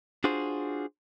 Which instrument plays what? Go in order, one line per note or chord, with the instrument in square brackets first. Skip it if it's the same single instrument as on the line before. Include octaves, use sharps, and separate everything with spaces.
[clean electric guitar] D4 F4 F#4 G#4 C5